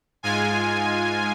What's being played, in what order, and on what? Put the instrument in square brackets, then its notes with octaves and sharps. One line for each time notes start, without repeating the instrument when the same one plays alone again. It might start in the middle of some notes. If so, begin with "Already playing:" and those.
[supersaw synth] G#2 G#3 F4 G#5